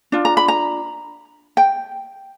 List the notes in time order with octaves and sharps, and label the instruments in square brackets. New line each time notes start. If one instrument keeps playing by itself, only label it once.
[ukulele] D4 F4
A#5
B5
A#5
G5